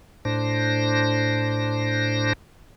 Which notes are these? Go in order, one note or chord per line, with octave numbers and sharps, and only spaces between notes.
A2 D4 C5 A#6